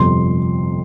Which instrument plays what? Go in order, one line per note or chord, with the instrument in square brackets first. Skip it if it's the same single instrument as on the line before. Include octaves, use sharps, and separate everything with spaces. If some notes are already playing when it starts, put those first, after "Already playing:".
Already playing: [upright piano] G1 F2 C3 C6